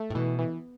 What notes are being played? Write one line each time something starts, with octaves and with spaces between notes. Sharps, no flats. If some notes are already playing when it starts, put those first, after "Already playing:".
Already playing: A3
A2
B2 E3
E3